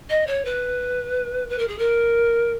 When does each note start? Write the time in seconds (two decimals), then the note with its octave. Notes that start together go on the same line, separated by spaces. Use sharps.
0.10 D#5
0.27 C#5
0.45 B4
1.49 B4
1.59 A#4
1.68 G#4
1.78 A#4